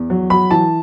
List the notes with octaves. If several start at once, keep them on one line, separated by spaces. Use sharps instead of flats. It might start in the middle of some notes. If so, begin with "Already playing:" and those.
Already playing: E2
F#3
F#3 B5
E3 A5